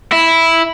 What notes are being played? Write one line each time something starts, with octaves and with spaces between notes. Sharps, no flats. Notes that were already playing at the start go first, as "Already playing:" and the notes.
E4